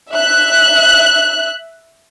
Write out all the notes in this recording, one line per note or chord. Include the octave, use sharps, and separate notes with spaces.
E5 F#6